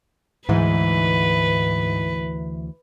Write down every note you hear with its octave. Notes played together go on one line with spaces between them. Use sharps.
D2 G#2 E3 B4